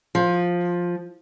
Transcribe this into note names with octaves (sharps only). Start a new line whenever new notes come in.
F3